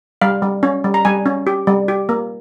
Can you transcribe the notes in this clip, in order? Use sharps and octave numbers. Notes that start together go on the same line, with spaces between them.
G3 F5
G3
C#4
G3
A#5
G3 G#5
C#4
G4
G3
G4
A#3